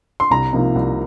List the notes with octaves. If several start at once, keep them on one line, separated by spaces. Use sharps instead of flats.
C6
C2 A#5
C3 F3 A#3 D#4
C2